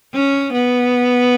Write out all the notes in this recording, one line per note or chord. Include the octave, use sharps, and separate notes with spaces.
C#4
B3